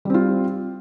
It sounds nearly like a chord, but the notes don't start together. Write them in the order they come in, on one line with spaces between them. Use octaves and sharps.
G3 C4 F4